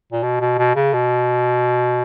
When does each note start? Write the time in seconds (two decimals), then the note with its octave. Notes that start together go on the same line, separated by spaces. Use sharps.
0.12 A#2
0.23 B2
0.40 B2
0.58 B2
0.75 C#3
0.93 B2